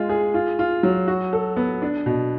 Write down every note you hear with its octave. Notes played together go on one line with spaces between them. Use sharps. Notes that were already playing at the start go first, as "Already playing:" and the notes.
Already playing: G#3 F4
G#4
F4
F4
F#3
F#4
A4
B3
D4
B2